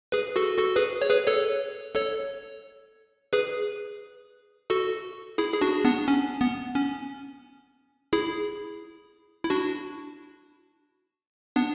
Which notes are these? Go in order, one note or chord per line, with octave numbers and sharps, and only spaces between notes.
G#4 B4
F#4 A4
F#4 A4
G#4 B4
C#5
G#4 B4
A4 C#5
A4 C#5
G#4 B4
F#4 A4
E4 G#4
G#4
D4 F#4
B3 D4
C#4
B3
C#4
E4 G#4
E4
D4 F#4
B3 D4